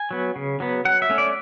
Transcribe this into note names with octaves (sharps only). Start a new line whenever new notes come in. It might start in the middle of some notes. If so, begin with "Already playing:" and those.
Already playing: G#5
F#3 B3
C#3
F#3 B3
F#3 F#5
E5
A3 C#4
D5